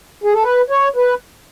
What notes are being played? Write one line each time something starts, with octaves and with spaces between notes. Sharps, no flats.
G#4
A4
B4
C#5
B4